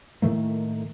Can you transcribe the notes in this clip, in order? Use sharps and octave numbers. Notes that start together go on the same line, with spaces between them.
A2 D#3 A3 A#3